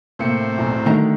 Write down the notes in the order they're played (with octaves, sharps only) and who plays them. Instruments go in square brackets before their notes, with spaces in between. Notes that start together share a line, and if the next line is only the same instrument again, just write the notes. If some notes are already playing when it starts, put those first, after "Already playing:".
[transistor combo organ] A2 C4 [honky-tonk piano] C3 A#3 C#7
[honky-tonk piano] B1 E2 A#5
[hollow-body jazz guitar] D3 A3 A#5 [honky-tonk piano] D#3 D#4 F#4